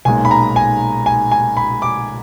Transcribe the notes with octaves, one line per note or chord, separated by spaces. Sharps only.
B1 A#2 G#3 D#4 G#5
B5
A#5
G#5
G#5
G#5
B5
D6